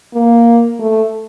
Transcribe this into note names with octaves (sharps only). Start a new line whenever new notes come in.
A#3
A3